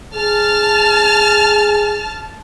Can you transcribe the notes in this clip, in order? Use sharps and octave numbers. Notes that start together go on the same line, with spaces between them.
G#4 A5 F6